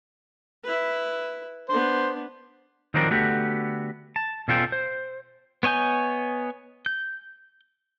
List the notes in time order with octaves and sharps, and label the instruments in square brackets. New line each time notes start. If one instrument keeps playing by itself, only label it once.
[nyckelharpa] E4 B4
[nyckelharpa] B3 D4 [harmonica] C5
[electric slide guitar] D#3 F3 F#3 C4 D4 A#4
D3 A3 B3 F#4 G4
A5
B2 C#4 F4 A4 A#4 G5
C5
[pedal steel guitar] B3 C#5 D#5 G#5 G6
G6